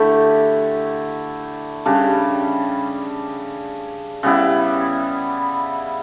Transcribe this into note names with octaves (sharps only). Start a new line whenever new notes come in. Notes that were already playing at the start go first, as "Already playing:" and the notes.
Already playing: D3 A3 E4 G4
C#3 G3 D4
C#3 G3 B3 E4